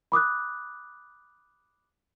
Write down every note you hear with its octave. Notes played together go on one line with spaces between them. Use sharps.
B5 D6 D#6 F#6